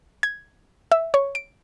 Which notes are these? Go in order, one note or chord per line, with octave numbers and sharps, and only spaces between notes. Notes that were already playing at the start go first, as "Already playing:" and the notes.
G#6
E5
C#5
D7